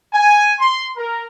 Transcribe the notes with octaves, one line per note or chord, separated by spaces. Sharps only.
G#5
C6
A#4